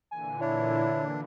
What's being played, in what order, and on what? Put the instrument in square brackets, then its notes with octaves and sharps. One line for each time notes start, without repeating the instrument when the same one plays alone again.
[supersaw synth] A#2 D3 E3 [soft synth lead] G#5
[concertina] D4 [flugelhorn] E4 [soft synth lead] C#5